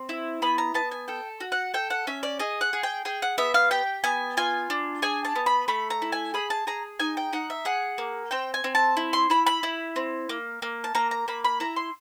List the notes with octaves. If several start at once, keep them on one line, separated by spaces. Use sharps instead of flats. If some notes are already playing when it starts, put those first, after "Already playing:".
Already playing: C4
E4
B3 B5
A#5
B3 A5
G#5
A4 G5
F#4
F#5
A4 G5
F#5
C#4 E5
D5
G#4 D#5
F#5
G#4
G5
G#4 G5
F#5
B3 E5
F5
G4 G5
B3 G#5
F4 G#5
D4
G#4 G#5
A5
B3
B5
A3 B5
A#5
E4
G#5
G#4 B5
A5
G#4 A#5
D#4 G#5
G5
D#4 F#5
E5
G#4 F#5
A#3
C4 G5
G#5
C4
A5
E4
C6
E4 B5
B5
E4
C4
A#3
A#3
A5
A#3 A#5
A#5
A#3 B5
B5
E4 A#5
C6